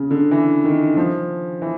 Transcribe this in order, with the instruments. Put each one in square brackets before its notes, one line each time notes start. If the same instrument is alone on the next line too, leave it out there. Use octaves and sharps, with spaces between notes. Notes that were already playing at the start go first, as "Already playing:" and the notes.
Already playing: [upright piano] C#3
D3
E3
D#3
F3
E3